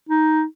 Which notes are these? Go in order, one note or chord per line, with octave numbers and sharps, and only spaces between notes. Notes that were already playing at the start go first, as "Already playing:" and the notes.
D#4